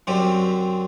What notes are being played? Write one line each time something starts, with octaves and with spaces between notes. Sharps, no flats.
F#2 D3 F#3 C4 G4